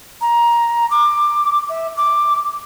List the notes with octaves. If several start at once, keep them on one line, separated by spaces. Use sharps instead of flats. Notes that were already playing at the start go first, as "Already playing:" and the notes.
A#5
D6
E5
D6